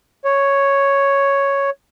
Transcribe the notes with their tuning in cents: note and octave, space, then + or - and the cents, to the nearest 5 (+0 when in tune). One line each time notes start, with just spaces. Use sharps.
C#5 +0